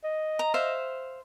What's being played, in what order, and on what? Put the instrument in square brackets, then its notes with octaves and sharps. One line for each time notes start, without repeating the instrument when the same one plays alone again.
[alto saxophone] D#5
[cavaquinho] A#5
C5 E5 F5